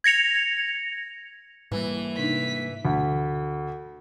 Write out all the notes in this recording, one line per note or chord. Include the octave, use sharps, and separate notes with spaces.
G#6 A#6 C#7 F7
G#2 E3 G3 A#3
C3 D4 D#4 B6
D2